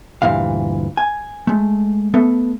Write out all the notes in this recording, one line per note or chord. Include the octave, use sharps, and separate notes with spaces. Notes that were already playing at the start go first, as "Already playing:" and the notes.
D2 G2 A#2 E3 F5
G#5
G#3 A3
A3 B3 A4